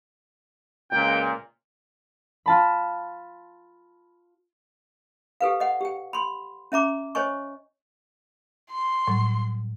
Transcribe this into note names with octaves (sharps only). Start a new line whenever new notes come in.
C#2 A#2 G5
F4 A5 B5
G4 A4 B4 F5
D#5 F#5
G4 G5
B5 C6
C#4 E5 A#5 D6
C5 C#5 D#5 G#5 C#6
C6
A2 F#3 G3